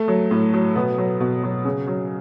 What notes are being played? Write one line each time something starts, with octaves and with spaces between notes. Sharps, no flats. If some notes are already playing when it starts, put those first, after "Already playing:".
Already playing: A3
F#3
A2
F#3
B2 B3
F#3
B2
F#3
C#3
F#3